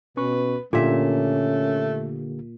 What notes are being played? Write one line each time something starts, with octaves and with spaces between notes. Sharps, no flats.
B2 C#4 B4 C#6
A#2 D3 A3 A#3 C#4 G4 E5